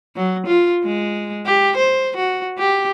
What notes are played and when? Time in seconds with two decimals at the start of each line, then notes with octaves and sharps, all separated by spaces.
0.16 F#3
0.47 F4
0.85 G#3
1.46 G4
1.77 C5
2.17 F#4
2.59 G4